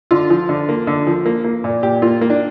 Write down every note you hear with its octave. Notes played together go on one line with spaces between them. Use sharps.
D3 F4
F3
D3
A#3
D3
F3
A#3
A#3
A#2
A#2 G4
A#3 F4
A#3
D4